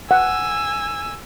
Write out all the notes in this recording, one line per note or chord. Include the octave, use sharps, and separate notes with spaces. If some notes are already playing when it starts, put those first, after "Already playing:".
F#5 G#5 E6